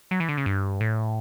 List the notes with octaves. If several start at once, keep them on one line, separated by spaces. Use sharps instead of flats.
F#3
E3
D3
C#3
G2
A2